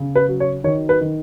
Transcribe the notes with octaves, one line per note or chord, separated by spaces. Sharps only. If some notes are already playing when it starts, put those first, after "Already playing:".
Already playing: C#3
B4
F#3
C#5
D#3 C#5
B4
D#3